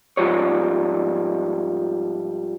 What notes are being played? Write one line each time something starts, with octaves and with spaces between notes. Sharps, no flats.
G#2 F3 G3 C#5